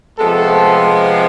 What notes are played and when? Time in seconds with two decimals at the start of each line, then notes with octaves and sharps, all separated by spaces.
0.18 C3 F3 G#3 A3 B3 A4